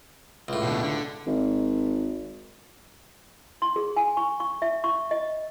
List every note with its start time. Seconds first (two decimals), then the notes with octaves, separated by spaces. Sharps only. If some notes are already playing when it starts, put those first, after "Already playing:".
0.48 C#2 A2
0.63 B2 D3
0.83 D3
1.27 G#1
3.62 C6
3.76 G#4
3.96 G#5
4.17 C#6
4.40 C#6
4.62 E5
4.84 C#6
5.11 D#5